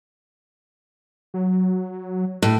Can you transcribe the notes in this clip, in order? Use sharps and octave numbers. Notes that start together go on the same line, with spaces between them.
F#3
A2